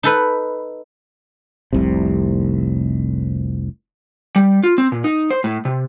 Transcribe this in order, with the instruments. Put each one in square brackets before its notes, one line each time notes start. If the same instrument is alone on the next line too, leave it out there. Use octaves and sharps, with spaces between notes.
[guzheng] D#4 A4 B4
[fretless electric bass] F1 C2 C3
[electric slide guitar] G3
F4
C4
A#2
D#4
C5
A2
C3